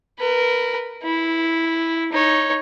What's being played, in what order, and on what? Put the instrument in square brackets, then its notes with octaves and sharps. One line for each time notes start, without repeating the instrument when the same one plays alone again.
[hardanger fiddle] A#4 B4
E4
D#4 C#5